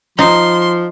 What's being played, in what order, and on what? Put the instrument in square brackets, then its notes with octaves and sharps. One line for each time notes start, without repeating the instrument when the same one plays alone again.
[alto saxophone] F3 [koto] D#4 [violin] C6